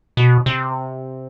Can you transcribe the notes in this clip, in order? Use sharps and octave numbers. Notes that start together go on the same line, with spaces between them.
B2
C3